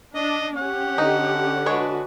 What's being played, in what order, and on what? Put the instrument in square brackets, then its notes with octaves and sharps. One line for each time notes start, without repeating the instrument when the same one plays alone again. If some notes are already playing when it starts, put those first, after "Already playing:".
[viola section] D4 [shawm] D#5
[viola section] C#4 G4 [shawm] F#5
[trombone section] D3 [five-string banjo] D#4
[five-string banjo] G#3 D4 C#5 [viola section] F#4 B4